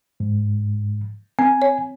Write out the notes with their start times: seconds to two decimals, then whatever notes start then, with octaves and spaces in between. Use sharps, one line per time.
0.20 G#2
1.39 C4 G#5
1.62 C#5